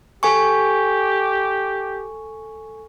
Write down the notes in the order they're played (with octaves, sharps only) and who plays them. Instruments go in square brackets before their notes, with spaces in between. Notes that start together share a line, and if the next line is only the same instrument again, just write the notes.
[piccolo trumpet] G4 [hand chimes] A4 G#5 C#6